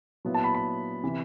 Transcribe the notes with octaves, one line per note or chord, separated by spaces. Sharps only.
A#2 F#3 B3 E4
A5
B5
B5
C3 E3